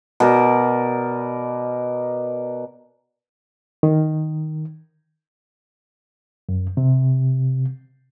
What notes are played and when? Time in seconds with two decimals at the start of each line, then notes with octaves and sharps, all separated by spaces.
0.20 B2 A#4 D5
3.83 D#3
6.49 F#2
6.77 C3